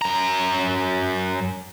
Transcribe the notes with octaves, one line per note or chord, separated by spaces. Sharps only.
F#2 A#5